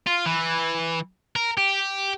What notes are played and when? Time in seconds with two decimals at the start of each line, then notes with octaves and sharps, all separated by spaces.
0.07 F4
0.26 E3
1.36 A#4
1.58 G4